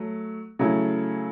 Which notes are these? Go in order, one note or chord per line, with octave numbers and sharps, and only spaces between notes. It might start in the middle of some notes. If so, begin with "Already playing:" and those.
Already playing: F#3 A3
C#3 F#3 A3 E4